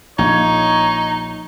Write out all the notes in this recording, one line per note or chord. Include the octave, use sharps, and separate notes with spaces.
A#1 D#4 C#5